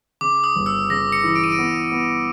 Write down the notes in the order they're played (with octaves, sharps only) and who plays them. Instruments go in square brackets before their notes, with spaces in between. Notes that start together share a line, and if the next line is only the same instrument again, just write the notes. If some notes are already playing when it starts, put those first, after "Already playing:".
[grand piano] C#3 [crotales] D6
[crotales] D#6
[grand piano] G1
[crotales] E6
[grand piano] C#3 [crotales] A#6
[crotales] C#7
[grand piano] E3
[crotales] D7
D#7
D7
[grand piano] B3
B3